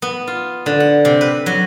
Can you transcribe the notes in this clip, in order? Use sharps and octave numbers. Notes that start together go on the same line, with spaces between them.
B3
F4
D3
F#5
C3
B4
F#3